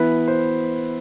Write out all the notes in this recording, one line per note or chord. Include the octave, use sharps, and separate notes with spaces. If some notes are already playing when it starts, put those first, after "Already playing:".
Already playing: E3 B3 E4 B4
C5